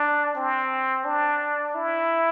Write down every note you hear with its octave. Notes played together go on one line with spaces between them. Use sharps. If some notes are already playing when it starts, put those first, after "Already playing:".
Already playing: D4
C4
D4
E4